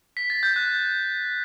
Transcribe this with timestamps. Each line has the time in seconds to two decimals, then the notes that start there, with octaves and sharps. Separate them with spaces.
0.17 B6
0.30 A6
0.43 G6
0.56 F#6